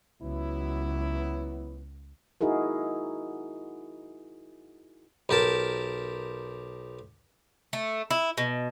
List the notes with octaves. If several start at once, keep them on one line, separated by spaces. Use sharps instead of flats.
C#2 F#3 B3 E4
D#4 E4 F#4 G#4 A#4
B1 G4 A#4 A5
A3
E4
B2